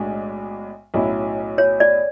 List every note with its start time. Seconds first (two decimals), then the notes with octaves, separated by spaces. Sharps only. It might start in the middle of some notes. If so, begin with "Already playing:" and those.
Already playing: B1 A2 G#3 D4 F#4
0.94 B1 A2 F#3 C#4 E4
1.58 C#5
1.80 D5